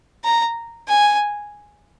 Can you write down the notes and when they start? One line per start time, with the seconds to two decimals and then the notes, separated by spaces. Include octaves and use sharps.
0.24 A#5
0.88 G#5